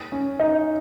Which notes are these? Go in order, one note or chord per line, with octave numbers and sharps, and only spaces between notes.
C#4
D#4